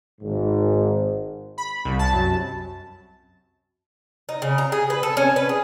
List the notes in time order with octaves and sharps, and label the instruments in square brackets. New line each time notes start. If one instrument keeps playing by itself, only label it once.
[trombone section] G#1 G#2
[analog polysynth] B5
C2
A5
F#2
[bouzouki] D#4
C#3
A#5
G#4
B4
A4
C#4
B4
G#4